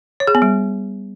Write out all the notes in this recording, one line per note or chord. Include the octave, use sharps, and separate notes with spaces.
C#5
G#4
B3
G3